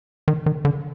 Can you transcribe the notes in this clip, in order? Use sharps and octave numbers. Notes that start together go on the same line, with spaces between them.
D#3
D#3
D3